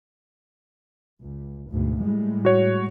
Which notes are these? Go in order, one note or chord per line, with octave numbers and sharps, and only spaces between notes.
C#2
D2 G#2 B2
A2 G3 G#3
F#4 C#5